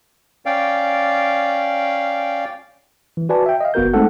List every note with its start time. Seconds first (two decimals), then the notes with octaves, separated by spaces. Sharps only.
0.46 C#4 D5 F5 G5
3.17 E3
3.29 F#4 B4 D5 G#5 A5
3.46 E5 G5
3.61 D#5 F5
3.74 G1 B3 F#4 A#4 G6
3.94 G#3 A3 C4 D#4 A4 F#5